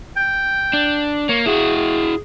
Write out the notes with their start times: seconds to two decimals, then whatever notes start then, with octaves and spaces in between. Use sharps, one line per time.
0.17 G5
0.73 D4
1.29 A#3 C#5
1.46 E4 F#4 G#4
1.77 G#4